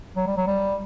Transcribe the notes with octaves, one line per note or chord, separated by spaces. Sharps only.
F#3
G3
F#3
G3